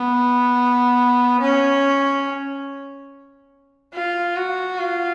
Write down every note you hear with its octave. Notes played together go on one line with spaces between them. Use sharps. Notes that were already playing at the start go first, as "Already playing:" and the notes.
Already playing: B3
C#4
F4
F#4
F4